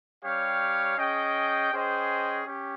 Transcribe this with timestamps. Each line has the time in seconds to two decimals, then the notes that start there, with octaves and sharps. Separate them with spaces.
0.24 G3 C#4 G4 C#5 F5
0.98 C#4 G#4 D#5 G5
1.72 C#4 G#4 C5 D#5 G5
2.46 C#4 G4